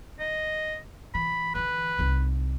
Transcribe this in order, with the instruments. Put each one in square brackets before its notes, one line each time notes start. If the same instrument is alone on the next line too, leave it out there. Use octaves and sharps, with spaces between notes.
[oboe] D#5
[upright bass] E3 [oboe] B5
[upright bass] D3 E3 [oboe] B4
[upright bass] C2 D#4